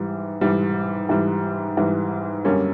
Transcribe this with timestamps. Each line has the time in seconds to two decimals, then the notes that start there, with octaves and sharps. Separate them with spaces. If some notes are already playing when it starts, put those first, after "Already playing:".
Already playing: G#2 E3 G3
0.41 G#2 E3 G3
1.09 G#2 E3 G3
1.77 G#2 E3 G3
2.44 F#2 D3 G3 A#3 C#4